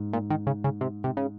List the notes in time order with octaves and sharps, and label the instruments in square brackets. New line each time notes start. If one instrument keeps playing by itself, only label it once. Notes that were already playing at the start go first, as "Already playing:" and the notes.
Already playing: [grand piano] G#2
[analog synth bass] A#2
D#3
C#3
C#3
C3
C3
C#3